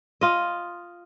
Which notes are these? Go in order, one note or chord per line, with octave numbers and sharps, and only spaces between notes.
F4 D#5